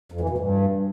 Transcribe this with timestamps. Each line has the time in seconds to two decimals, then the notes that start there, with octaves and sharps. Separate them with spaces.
0.12 F2
0.21 E3
0.29 B2
0.38 G2